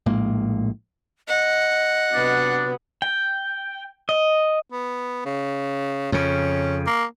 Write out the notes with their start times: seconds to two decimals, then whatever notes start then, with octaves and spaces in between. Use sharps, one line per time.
0.06 A#1 A2 G#3 A#3
1.28 D#5 F#5
2.14 C3 F#3 B3 D4
3.02 G5
4.09 D#5
4.71 B3
5.25 C#3
6.12 F2 C#3 C#4
6.87 A#3